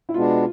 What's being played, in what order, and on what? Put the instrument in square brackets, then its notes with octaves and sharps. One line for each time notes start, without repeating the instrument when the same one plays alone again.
[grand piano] E4
[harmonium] B2 G#3 B3 D4 [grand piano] F4